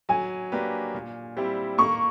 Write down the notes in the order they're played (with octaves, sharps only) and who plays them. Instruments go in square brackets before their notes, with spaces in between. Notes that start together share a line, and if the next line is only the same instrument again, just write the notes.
[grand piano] F#3 [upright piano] G#5
[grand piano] A#3 D4 G4 B4
A#2
G3 C4 E4 G4
[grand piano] A#3 [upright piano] C#6